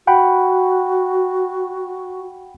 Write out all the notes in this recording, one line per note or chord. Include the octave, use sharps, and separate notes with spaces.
F#4 F#5 G5 B5